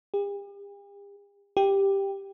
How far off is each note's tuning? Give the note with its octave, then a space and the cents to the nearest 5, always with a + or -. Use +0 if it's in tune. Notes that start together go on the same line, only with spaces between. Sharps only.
G4 +45
G4 +5